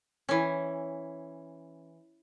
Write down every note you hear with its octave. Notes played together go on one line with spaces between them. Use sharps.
E3 C#4